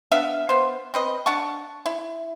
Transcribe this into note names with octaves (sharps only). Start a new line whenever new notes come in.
B3 D4 E5 F5
B3 C5
C4 B4 D#5
D4 F#5 A5 C#6
E4